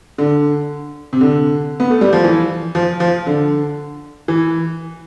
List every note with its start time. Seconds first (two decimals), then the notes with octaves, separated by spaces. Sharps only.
0.18 D3
1.13 C3
1.21 D3
1.80 B3
1.90 A3
2.01 G3
2.13 F3
2.24 E3
2.75 F3
3.00 F3
3.27 D3
4.28 E3